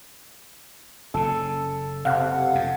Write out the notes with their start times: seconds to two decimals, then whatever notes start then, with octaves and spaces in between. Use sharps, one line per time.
1.14 F#1 C#3 A4
2.05 C3 F5 F#5
2.55 F2